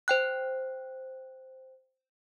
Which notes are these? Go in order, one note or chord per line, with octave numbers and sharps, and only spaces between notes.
C5 G5 F#6